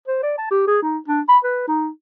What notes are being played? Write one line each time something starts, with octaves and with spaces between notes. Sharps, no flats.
C5
D5
A5
G4
G#4
D#4
D4
B5
B4
D#4